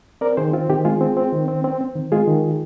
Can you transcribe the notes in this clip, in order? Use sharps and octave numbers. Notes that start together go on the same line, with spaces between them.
C4 A#4 D5
D#3 G#4 C5
C4 F4
D#3 G4
G#3 F4 G#4
C4
C4
D#3
C4
C4
C4
D#3
G#3 F4 G#4
D#3